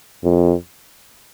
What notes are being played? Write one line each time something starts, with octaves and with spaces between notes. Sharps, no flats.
F2